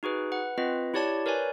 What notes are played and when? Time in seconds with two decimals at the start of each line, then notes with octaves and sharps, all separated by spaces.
0.03 D#4 F#4 G#4 B4
0.32 B4 F#5
0.58 C4 F4 B4 D#5
0.94 E4 G4 C#5 D5 A5 G#6
1.26 A#4 B4 C#5 D5 G#5